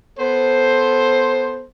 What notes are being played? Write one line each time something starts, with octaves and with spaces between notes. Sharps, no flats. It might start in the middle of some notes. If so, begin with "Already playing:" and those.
B3 A4 C5